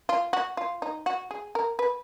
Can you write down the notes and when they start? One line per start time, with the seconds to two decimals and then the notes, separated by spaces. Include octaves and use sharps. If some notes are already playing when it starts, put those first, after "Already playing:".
0.09 F4
0.33 F#4
0.57 F4
0.82 D#4
1.06 F#4
1.31 G#4
1.55 A#4
1.79 B4